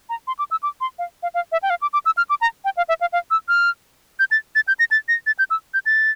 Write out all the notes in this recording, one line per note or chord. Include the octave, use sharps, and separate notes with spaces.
A#5
C6
D6
E6
D6
C6
F5
F5
F5
E5
G5
F5
D6
D6
E6
F6
D6
A#5
G5
F5
E5
F5
F5
E6
F6
G6
A6
A6
G6
A#6
A6
A#6
A6
G6
E6
G6
A6